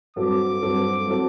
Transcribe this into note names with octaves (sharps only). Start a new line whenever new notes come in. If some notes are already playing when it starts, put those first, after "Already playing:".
G2 F#3 C4 F#4 A4 D6
G2 F#3 C4 F#4 A4
F#3 C4 F#4 A4